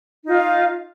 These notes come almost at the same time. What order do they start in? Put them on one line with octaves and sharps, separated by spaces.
D#4 F4 D#5 F5